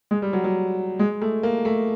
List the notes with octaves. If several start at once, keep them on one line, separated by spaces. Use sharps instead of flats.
G#3
G3
F#3
F#3
G#3
A3
A#3
A3